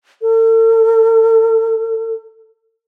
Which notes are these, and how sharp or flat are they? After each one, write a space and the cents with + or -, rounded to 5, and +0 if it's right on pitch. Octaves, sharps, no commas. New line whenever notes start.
A4 +40